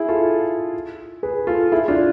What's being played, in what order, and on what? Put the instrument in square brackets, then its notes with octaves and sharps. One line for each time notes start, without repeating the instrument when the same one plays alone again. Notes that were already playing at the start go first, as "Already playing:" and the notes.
Already playing: [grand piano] E4 G#4
F4 A4
G#4 B4
F4 A4
E4 G#4
D4 F4